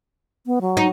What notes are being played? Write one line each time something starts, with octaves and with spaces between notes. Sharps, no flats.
B3
F#3
D#4